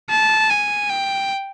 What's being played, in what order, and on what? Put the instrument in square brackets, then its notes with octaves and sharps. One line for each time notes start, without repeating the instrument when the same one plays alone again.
[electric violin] A5
G#5
G5